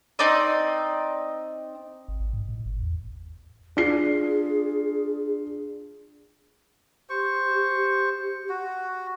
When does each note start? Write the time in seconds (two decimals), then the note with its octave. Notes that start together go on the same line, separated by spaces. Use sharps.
0.19 C4 D#4 D5 D#5
2.08 G1
2.20 G#1
2.33 G#2
2.49 A2
2.66 G1
2.80 E2
3.77 D4 F4 G#4 C7
7.10 G4 C5 C#6
8.49 F#4